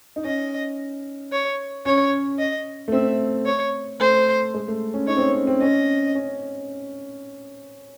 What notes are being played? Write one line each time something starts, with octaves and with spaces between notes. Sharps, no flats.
D#4
C#4 D#5
C#5
C#4 C#5
D#5
A3
C4 E5
C#5
A3 C5
G#3
A3
C#4
D#4 C#5
C4
C#4
C#4
C4
C#4 D#5
C#4